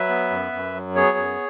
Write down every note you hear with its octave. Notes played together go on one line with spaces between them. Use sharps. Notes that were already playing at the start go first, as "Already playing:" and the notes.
Already playing: F#3 B4 E5
B3
F#2
F#2
F#3
B3 G#4 C#5
F#2